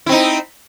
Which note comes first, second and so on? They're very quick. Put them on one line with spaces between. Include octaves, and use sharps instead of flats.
E4 C4 D#4